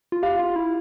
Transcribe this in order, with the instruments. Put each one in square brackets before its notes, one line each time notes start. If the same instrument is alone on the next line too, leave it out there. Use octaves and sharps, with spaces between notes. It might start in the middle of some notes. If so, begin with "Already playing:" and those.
[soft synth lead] F4
[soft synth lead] G4 [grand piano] F5
[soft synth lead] F4
E4